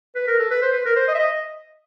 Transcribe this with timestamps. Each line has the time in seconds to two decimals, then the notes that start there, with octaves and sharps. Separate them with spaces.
0.16 B4
0.28 A#4
0.39 A4
0.51 B4
0.62 C5
0.73 B4
0.85 A#4
0.96 C5
1.08 D#5
1.15 E5
1.19 D#5